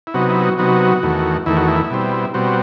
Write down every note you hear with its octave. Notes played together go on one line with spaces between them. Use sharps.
E4
C3 F#3 B3 D#4 F#4
E4
F#4
C3 F#3 B3 D#4 F#4
E2 D#3 A3
E2 D#3 A3 E4
F#4
E4
B2 G3 C4
B2 G3 C4 F#4